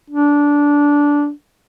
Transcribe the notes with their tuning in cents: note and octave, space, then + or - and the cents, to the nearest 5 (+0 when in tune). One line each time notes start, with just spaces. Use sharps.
D4 -15